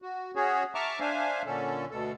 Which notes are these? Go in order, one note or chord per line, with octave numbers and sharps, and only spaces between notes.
F#4
C#4 F#4 G#4 C#5
E5 A5 A#5 C#6 D6 F6
D4 C5 E5 F5 G#5
A#2 D3 C#4 A4
D2 B2 A4